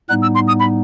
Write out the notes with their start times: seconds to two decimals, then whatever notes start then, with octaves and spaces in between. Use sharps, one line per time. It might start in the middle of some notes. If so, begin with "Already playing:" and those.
0.09 A2 G3 B3 D#4 F#6
0.22 E6
0.35 C6
0.48 D#6
0.59 B5